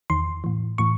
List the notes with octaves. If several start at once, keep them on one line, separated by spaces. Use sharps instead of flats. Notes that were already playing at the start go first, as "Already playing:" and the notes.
E2 D#3 C6
A2 E3
A2 E3 C#6